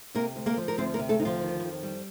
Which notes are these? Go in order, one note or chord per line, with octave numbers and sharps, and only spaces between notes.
C3 A#3 A#4
D2
A#3 A#4
F3
A#4
D2 C4 C5
A#3 A#4
C3
A3 A4
D2 D#4
F3 F4
D#3
F2
G3